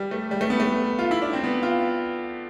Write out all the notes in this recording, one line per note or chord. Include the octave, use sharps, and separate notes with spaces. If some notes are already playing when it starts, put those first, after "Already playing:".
Already playing: G3
A3
G3
A3
B3
A3
F4
E4
D4
C4
B3
F4